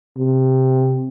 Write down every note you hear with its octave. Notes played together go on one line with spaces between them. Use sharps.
C3